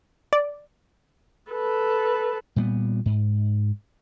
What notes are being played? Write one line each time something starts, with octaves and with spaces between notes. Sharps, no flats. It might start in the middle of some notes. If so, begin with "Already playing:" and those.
D5
A4 B4
A#2 G3 A#3 B3
G#2